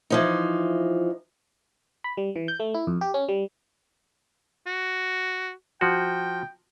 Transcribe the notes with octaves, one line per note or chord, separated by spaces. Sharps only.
E3 F3 D#4
B5
G3
E3
G6
A3
E4
F2
G4
C#4
G3
F#4
F3 F#4 G5